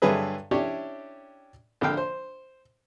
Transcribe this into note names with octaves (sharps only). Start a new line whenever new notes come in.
G2 D3 F#3 G#4 B4 E5
C#4 D4 E4 G4 C#5 D5
A#1 D3 F5 G5
C5